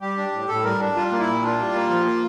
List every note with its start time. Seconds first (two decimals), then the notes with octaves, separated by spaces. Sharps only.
0.01 G3 G4
0.17 D4
0.32 A2
0.48 A2 A4
0.64 G3 A#4
0.80 D4
0.96 G3 F4
1.12 A#3
1.20 E4
1.27 A#2
1.42 D4 F4
1.58 G3
1.74 A#3
1.90 F3
2.05 A#3